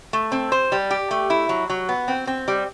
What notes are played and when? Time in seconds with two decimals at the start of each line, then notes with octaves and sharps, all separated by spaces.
0.13 A3
0.32 C4
0.52 C5
0.72 G3
0.91 G4
1.11 A3
1.30 E4
1.49 F#3
1.70 F#3
1.89 B3
2.08 C4
2.27 C4
2.48 G3